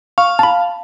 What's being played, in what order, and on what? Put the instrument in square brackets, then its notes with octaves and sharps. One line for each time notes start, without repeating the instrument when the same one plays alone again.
[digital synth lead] F5 [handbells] C#6
[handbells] A5 B5